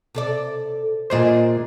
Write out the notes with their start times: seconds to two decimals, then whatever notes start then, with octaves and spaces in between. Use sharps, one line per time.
0.15 C3 A4 D5
1.10 A#2 D4 G#4 C5 D#5